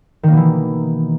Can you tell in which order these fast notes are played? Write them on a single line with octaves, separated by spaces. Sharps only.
D#3 A#3 B2 E3